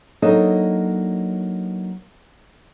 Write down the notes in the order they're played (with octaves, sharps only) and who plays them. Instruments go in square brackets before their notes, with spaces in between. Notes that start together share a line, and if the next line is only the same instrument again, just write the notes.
[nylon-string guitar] F#3 A#3 D4 D#4 A4 D#5